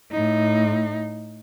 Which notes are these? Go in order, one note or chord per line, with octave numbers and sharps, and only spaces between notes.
A2 D#4